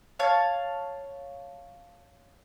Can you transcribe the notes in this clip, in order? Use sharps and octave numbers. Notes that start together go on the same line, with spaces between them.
C#5 F5 A5